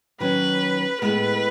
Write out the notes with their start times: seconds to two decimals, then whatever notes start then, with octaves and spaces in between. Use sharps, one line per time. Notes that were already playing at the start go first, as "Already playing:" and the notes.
0.20 D#3 F#3 C#4 B4
1.01 A2 G#3 B3 B4